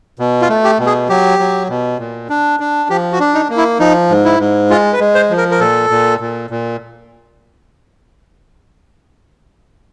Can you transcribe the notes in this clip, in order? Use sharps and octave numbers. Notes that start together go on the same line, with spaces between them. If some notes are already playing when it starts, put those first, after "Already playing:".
B2
F4
A3
G4
B2
G#4
F#3 G4
F#3
B2
A#2
D4
D4
F3 G4
F#4
D4
D#4
A#3
E4
F3 D#4
G#2
E4
G#2
G#3 F4
B4
G#3
C5
F3
A#4
A#4
A#2 A4
A#2
A#2
A#2